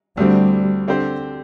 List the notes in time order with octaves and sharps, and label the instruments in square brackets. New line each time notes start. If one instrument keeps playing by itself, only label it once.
[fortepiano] D2 D3 C4 [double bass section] G3
[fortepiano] D3 C4 G4 C5